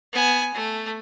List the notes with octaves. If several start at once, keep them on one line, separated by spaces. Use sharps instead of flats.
B3 G#5
A3